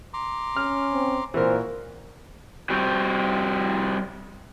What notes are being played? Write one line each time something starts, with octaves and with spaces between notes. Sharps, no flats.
A#5 C6 D6
C#4 F6
C4
A#2 E3 F#4 A#4 C5
G3 C4 F#4 G4